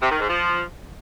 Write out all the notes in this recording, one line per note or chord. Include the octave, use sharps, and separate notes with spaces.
C3
D#3
G#2
F3